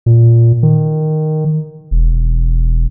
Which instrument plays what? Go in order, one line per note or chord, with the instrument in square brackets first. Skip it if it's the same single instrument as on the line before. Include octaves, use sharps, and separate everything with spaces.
[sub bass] A#2
D#3
E1